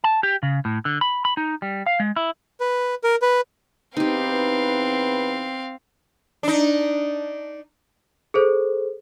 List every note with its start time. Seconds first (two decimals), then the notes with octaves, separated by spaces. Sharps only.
0.04 A5
0.23 G4
0.43 C#3
0.65 A2
0.85 D3
1.01 B5
1.25 B5
1.37 D#4
1.62 G3
1.86 F5
2.00 G#3
2.16 E4
2.60 B4
3.04 A#4
3.22 B4
3.97 E2 C4 D#4 G4 B4 F5
6.43 D4 D#4
8.34 G#4 A4 C5